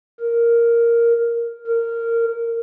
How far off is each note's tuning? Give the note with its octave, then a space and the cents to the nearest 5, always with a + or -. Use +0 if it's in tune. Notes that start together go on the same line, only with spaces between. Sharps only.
A#4 +0
A#4 -15